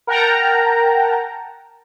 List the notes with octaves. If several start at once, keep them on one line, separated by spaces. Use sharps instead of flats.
A#4 F#5 G5 A5 A#5